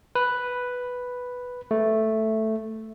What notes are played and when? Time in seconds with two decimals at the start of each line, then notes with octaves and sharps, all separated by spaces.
0.15 B4
1.71 A3